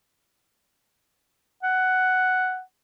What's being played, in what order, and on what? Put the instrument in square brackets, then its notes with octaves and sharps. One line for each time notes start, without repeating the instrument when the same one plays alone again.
[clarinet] F#5